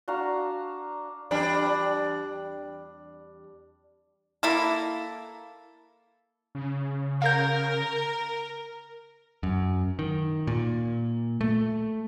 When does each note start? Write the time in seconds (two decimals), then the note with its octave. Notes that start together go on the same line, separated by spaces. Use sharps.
0.08 D4 F#4 F5 A#5
1.31 E2 G3 D4
4.43 A#3 E4 A4
6.55 C#3
7.22 A#4 F5 G6
9.43 F#2
9.99 D#3
10.47 A#2
11.41 A3